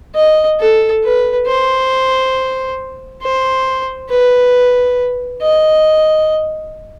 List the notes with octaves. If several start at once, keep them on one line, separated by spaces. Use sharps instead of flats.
D#5
A4
B4
C5
C5
B4
D#5